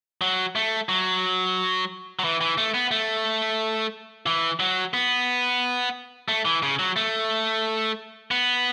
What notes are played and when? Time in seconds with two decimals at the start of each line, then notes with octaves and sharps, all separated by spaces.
0.21 F#3
0.56 A3
0.89 F#3
2.19 F#3
2.24 E3
2.41 E3
2.58 A3
2.74 B3
2.91 A3
4.26 E3
4.60 F#3
4.94 B3
6.28 A3
6.45 E3
6.63 C#3
6.79 F#3
6.96 A3
8.31 B3